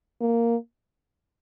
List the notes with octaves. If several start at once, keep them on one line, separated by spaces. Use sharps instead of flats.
A#3